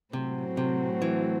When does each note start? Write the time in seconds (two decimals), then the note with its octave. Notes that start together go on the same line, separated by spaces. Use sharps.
0.13 A2 C3 F#3 A3 C4 F#4
0.57 C3
1.02 E3